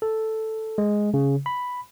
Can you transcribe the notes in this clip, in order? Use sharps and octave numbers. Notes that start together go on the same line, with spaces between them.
A4
G#3
C#3
B5